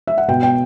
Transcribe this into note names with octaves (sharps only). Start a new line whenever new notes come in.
E5
F#5
B2 G5
G5